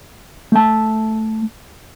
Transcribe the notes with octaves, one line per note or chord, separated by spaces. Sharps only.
A3 A5